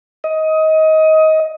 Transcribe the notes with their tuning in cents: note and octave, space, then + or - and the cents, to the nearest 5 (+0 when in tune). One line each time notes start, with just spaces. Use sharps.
D#5 +20